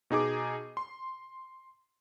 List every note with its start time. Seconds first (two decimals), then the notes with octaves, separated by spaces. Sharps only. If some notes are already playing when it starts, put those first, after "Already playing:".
0.10 B2 D#4 G#4 D6
0.77 C6